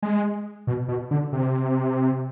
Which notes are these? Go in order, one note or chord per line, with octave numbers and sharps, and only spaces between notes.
G#3
B2
B2
D3
C3